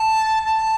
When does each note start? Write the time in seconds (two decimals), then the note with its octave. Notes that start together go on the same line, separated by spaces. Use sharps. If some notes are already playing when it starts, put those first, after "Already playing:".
Already playing: A5
0.45 A5